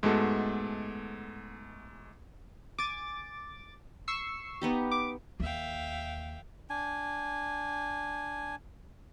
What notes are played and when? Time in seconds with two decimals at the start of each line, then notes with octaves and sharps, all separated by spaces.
0.03 G#2 G#3 A3 B3 F#4 A4
2.78 G#5 D6 A6
4.08 C#6 E6 C7
4.62 B3 D#4 G4
4.91 D6
5.40 D#2 E5 F5 G5
6.70 D4 G#5